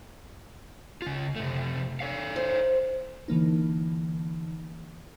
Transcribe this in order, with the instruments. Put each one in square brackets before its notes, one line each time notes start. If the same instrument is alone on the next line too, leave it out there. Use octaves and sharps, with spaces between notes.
[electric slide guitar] C#3 F4
C3 A3
A4 C#5 F5
[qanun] C5
[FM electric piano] D3 E3 A#3 D#4